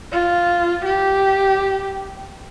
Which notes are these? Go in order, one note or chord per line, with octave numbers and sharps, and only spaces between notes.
F4
G4